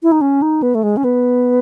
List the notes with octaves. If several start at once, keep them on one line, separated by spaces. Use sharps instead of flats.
E4
D#4
C#4
D#4
B3
A3
G#3
C#4
B3